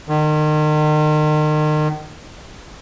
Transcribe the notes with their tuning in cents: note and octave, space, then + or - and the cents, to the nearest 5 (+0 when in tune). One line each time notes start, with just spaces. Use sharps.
D#3 -35